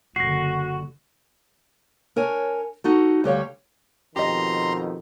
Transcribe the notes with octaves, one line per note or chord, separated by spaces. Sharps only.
F#1 D3 F#4 A#6 C7
D4 A#4 C#5 G#5
D#4 F#4 A4
D2 G3 C#5 F5
F2 B2 D#3 G4 D#5 A#5 C6